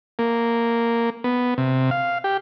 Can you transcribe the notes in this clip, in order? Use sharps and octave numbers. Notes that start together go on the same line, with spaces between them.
A#3
B3
C3
F5
G4